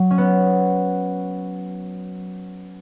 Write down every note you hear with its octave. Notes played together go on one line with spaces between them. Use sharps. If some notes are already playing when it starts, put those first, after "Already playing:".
Already playing: F#3
C#4
B3